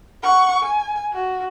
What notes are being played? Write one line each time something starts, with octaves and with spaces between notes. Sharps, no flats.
F#5 C#6
G#5
F#4